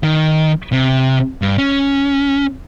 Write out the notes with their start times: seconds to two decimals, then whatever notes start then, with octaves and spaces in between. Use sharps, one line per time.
0.03 D#3
0.73 C3
1.42 G2
1.58 C#4